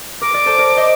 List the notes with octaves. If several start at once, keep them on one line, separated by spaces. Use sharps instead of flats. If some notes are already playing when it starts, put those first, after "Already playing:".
A#4 D6
A#4 D5
A4 C5
A#4 D5
C5 D#5